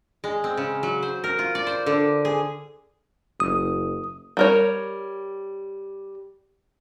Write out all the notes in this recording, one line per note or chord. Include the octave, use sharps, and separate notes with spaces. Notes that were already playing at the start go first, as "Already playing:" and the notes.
G#3
C4
C#3
F#3
C5
A#4
F4
D5
C5
D3
G#4
F#1 D#6
G3 A#4 C#5